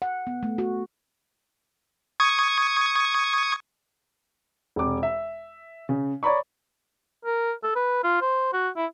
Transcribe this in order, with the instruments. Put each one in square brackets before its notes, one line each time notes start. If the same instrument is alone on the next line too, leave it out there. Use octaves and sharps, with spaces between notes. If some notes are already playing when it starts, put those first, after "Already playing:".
[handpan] F#5
B3
A3
F#4
[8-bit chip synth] C#6 D#6 G#6
[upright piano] E1 C3 D6
E5
C#3
C#5 D5 A#5 B5 C#6
[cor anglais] A#4
A4
B4
F4
C5
F#4
E4